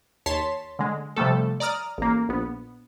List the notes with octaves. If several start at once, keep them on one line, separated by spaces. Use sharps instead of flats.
D#2 C#5 A5 C6 B6
D3 G#3
C3 F3 G3 A3 A4
D5 A#5 D#6 F6
A1 A#3
A#1 B3